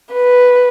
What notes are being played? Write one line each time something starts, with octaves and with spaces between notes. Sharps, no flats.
B4